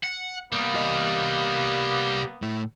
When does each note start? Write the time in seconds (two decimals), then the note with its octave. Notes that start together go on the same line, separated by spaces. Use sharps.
0.03 F#5
0.52 C2 G3 A#3 B3
0.75 G4 D#5
2.42 A2 E4